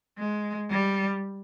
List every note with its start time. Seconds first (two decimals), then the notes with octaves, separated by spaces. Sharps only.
0.18 G#3
0.70 G3